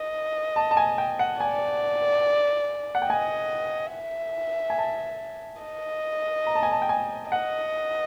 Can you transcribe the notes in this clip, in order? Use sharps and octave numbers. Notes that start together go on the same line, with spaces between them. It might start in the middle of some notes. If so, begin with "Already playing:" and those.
Already playing: D#5
A5
A5
G#5
G5
F#5
D5 G#5
F#5
G5
D#5 G#5
E5
G#5
A5
D#5
A#5
A5
G#5
A5
G5
G#5
D#5 F#5